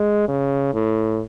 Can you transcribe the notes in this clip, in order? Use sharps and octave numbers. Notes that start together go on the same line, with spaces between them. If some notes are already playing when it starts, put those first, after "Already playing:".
Already playing: G#3
C#3
A2